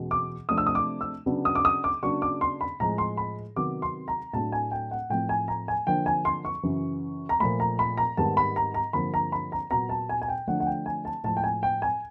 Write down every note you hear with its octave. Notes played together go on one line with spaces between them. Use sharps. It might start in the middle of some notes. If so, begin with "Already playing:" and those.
Already playing: E2 B2 G#3 C#4
D6
C3 F3 A3 D4 D#6
E6
D#6
D6
E6
C#3 F#3 B3 D4
D#6
D6
D#6
D6
C#3 F#3 A#3 D4 C#6
D6
C6
B5
A2 F3 G#3 A#5
C6
B5
C3 D#3 F#3 B3 D6
C6
A#5
A2 F#3 A3 D4 A5
G#5
G5
F#5
A2 F3 A3 C4 G5
G#5
A#5
G#5
D3 F3 A#3 D4 G5
G#5
C6
C#6
F#2 C#3 E3
A#5
A#2 F3 A3 B5
A#5
B5
A#5
G#2 D#3 G3 B3 A5
B5
A#5
A#5
G2 D3 F3 A#3 B5
A#5
B5
A#5
A#2 F#3 B3 A#5
A5
G#5
G#5
G5
D3 F3 A3 D4 F#5
F#5
G5
G#5
A5
A2 F3 G#3 A5
G5
G#5
G5
G#5